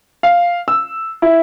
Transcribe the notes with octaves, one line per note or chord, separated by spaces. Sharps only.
F5
E6
E4